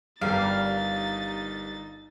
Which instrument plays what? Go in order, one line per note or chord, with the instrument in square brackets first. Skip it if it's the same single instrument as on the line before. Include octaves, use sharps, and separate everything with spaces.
[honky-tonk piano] G1 [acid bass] G3 [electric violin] D#4 A6 [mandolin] A#4 F5